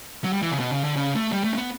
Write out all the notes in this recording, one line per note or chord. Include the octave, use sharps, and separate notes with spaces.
F#3
G3
E3
C#3
B2
C#3
D3
C#3
A3
G3
A3
C#4
B3